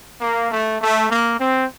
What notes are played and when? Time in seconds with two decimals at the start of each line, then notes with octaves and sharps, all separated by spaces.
0.20 A#3
0.50 A3
0.80 A3
1.09 A#3
1.38 C4